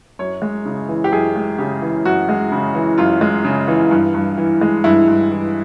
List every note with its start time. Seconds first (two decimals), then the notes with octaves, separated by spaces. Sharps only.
0.19 F#2 C#5
0.42 G#3
0.65 C#3
0.89 E3
1.04 G4
1.12 F#2 G#4
1.36 G#3
1.58 C#3 G4
1.82 E3
2.05 F#2 F#4
2.29 G#3
2.52 C#3
2.75 E3
2.98 F#2 F4
3.21 G#3
3.45 C#3
3.68 E3
3.91 G2
4.14 G2
4.38 E3
4.61 G#3
4.84 G2 E4
5.08 G2
5.31 E3